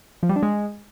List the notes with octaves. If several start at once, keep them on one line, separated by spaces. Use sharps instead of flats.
F3
G3
D4
G#3